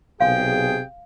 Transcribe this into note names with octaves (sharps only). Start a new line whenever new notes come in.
B1 C3 G#4 F5 G5